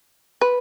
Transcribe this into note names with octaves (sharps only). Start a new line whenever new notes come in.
B4